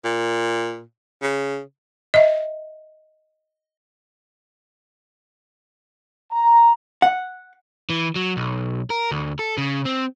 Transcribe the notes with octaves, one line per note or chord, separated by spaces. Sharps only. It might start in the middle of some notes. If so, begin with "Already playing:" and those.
A#2
C#3
D#5 E5
A#5
F#5
E3
F#3
B1
A#4
D2
A4
C#3
C4